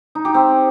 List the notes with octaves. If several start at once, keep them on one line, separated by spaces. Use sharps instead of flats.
D#4
G4
C4